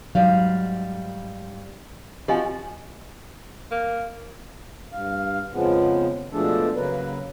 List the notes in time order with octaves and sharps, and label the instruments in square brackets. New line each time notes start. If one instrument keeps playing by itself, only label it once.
[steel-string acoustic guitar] G#2 G3 F5 [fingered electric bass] F#3
[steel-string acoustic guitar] F3 C4 F#4 [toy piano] G4 D#5 G#5
[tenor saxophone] A#3
[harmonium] G2 F5
F2 C#3 F3 G#3 B3
B2 F3 G#3 A3 D4 A4
C#3 F#3 A#3 B4